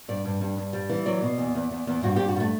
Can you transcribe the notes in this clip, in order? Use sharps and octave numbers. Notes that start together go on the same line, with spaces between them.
G2 D5
G2
G2
G2
G3
E3
F#3 D5
B2
E2
E2
E2
E2
G2 F#4
G2 G4
F#4
G3
A3